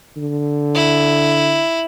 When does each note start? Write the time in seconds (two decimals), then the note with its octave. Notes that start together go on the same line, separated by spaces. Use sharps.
0.17 D3
0.75 E4